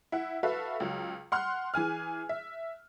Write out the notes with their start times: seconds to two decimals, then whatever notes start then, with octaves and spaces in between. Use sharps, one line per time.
0.12 E4 F#5
0.43 F#4 A4 B4 E5 F5
0.80 C#2 F#3
1.32 F#5 C6 F6 F#6
1.74 E3 G#4 G#5 F6
2.29 E5